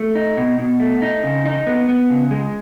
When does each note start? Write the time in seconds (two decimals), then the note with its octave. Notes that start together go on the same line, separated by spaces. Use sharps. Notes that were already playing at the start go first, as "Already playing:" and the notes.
Already playing: A3
0.15 D#4
0.37 B2
0.58 B2
0.80 A3
1.02 D#4
1.23 C#3
1.46 D#4
1.67 B3
1.88 B3
2.10 C#3
2.31 G#3